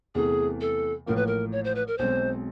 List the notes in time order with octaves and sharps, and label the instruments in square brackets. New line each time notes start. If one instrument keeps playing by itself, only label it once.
[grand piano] E2 C3 E3 A3 [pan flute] G#4
[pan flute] A4
[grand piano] A1 A2 F3 A#3 [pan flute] A#4
[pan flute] B4
A#4
C#5
C5
B4
A#4
[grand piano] B1 B2 G#3 C4 [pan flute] C5